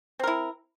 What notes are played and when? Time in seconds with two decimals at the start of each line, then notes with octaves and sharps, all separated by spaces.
0.19 C4
0.23 A#4
0.28 E4